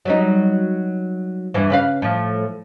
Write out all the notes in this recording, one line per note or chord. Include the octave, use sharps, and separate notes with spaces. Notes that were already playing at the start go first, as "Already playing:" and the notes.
F#3 G3 D#4
E2 G2 E3
C#3 B4 F5
A2 F3